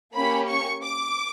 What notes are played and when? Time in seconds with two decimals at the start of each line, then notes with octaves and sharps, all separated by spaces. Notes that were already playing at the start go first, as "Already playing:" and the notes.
0.14 A#3 C#4 G4 B5
0.49 C#6
0.83 D6